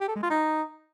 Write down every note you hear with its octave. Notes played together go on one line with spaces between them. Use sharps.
G4
A4
G#3
F4
D#4